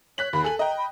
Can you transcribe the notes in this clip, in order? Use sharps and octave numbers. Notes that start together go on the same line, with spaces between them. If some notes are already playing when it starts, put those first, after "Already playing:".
C#5 F#6 B6 F#7
D#2 B5
A4 G#5 F#7
D#5 G5 A#5
B5